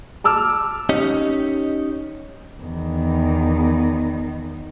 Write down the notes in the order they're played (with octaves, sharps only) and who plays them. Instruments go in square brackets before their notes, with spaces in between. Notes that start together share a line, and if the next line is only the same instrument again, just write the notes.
[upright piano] A5 D6 E6 F6
[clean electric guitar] C#4 D#4 G4 C#5 D#5
[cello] E2 D#3